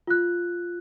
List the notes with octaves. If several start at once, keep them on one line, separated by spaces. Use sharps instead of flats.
F4 F#6